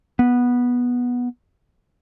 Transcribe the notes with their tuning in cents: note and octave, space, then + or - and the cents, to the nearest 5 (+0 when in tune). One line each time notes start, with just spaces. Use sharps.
B3 -10